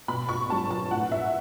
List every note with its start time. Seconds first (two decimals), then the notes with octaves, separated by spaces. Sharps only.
0.08 B2 B5
0.29 C#6
0.49 F#3 B3 A5
0.71 A5
0.91 A2 F#5
1.12 E5